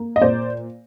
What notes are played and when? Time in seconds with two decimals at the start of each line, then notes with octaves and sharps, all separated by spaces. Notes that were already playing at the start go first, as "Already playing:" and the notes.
Already playing: A#3
0.16 D#5
0.22 A#2 C5 D5